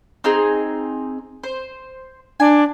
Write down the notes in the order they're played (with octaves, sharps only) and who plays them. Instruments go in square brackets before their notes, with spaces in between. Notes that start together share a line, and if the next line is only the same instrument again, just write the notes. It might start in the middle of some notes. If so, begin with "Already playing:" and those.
[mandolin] C4 D#4 G#4
C5
[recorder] D4 [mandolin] G#5